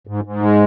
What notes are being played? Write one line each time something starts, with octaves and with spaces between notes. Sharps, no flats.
G#2
G#2
G#3